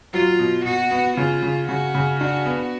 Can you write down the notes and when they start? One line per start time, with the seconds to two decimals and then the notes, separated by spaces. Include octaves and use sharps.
0.13 F#3 F4
0.39 B2
0.65 B2 F#4
0.91 B3
1.17 C#3 F4
1.43 C#3
1.68 C#3 F#4
1.95 C#3
2.20 D4 F#4
2.46 B3